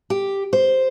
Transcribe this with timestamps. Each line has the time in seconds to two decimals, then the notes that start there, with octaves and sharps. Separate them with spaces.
0.10 G4
0.53 C5